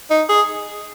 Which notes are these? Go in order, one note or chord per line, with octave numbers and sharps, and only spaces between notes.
D#4
G#4